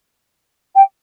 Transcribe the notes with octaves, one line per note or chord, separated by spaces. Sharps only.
G5